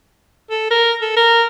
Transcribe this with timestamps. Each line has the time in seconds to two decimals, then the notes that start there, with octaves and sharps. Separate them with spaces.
0.51 A4
0.71 A#4
1.02 A4
1.16 A#4